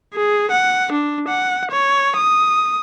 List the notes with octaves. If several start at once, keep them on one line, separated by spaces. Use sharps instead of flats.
G#4
F#5
D4
F#5
C#5
D#6